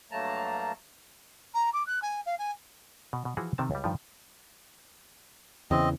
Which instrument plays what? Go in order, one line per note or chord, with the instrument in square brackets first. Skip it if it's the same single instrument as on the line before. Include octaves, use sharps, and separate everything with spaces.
[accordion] G2 F#3 A3 A#3 A5 A#5
[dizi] A#5
D6
F#6
G#5
F5
G#5
[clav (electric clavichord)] B2
B2
E3 F3 F#4 G#4
C3 D#3 C4 A5
C#2 G3
G2 D#3 F3
[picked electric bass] E2 C#3 E3 [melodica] C4 D#5